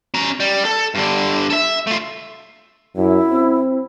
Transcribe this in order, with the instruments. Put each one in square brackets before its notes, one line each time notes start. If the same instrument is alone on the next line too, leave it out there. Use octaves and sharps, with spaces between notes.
[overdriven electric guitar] C#4 A#5
G3
A4
G2 D3
A4 E5
A3 F4
[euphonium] F#2 [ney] E4
[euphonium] C4